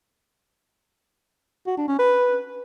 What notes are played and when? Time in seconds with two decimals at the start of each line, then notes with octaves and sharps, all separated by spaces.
1.67 F#4
1.77 D4
1.88 C#4
1.99 B4